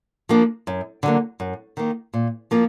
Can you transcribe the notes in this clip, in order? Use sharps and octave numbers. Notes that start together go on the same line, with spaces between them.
F3 A#3 D4
F#2
D3 F#3 A#3
F#2
D#3 A#3
A#2
F3 A#3 F4